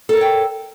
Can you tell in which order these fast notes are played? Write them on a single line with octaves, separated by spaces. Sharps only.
A4 A#4 C#5 G5